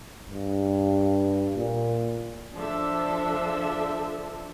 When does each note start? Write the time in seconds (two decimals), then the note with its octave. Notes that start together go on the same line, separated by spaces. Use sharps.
0.30 G2
1.57 A#2
2.54 F3 D4 A4 E5